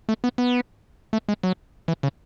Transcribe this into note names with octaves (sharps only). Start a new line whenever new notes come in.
A3
B3
B3
A3
G#3
F#3
E3
C#3